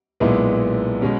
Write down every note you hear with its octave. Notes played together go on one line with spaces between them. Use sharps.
B1 A#2 G#3 B3 E4
B2 G#3 C#4